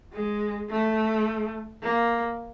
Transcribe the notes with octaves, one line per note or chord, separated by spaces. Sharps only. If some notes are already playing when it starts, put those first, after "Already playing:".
G#3
A3
A#3